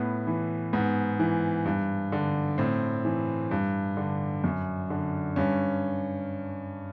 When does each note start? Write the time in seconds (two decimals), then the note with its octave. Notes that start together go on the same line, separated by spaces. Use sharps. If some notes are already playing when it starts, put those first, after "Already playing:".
Already playing: A2 B3
0.27 E3
0.73 G#2 B3
1.19 E3
1.65 G2
2.12 D3
2.58 A2 C4
3.05 E3
3.51 G2
3.97 D3
4.44 F#2
4.90 D3
5.36 G2 C#4